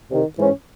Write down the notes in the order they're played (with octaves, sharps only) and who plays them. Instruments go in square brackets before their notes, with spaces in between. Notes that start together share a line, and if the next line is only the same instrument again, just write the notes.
[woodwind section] C2 C3 D#3
G#2 E3 G#3 C#4